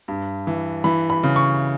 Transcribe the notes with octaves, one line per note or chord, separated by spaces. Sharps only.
G2
E3
E3 B5
B5
C#3
C#6